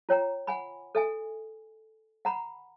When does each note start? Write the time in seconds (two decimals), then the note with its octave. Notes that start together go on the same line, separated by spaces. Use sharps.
0.09 F4 C#5 G5 A#5
0.47 F#5 G#5 B5
0.95 A4 E5 G#5
2.25 F#5 A#5 B5